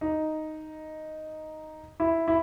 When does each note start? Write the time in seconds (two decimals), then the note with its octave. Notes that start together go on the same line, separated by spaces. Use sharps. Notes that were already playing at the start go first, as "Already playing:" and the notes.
0.01 D#4
2.00 E4
2.28 E4